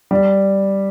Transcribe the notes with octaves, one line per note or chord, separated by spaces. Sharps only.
G3